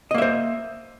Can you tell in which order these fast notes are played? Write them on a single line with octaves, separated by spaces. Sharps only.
D#5 A#3 E5 C5